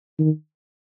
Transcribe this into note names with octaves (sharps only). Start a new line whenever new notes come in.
D#3